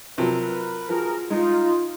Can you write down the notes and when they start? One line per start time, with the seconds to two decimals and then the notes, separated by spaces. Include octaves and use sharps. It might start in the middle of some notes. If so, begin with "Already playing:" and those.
0.18 C3 F3 F#3 A#4 B4
0.89 F3 F#4 G#4 A#4
1.30 G#3 D#4 F4